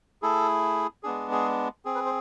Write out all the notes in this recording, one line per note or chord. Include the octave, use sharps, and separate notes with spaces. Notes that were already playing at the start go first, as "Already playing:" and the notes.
A3 E4 G#4 A4
G#3 B3 D4 G#4
G#4
C4 G#4
B4
C5